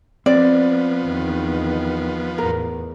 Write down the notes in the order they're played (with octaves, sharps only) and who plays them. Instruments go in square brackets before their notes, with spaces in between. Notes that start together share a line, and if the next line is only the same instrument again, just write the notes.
[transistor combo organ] F3 B3 [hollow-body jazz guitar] C4 [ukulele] D5
[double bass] E2 D#3
[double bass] E2 A2 [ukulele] A#4